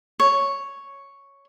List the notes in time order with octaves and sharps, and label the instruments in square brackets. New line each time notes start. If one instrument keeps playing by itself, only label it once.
[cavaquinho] C#5